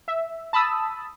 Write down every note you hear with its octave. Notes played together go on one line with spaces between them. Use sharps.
E5
A5 B5 D#6 E6